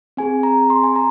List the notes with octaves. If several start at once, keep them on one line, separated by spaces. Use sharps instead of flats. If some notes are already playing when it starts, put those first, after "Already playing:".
C4 G#4 G#5
A#5
C6
G#5
A#5